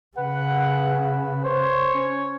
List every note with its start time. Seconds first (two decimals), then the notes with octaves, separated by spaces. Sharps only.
0.17 C#3 B4 F#5
0.93 B4
1.44 C5 C#5
1.94 C#4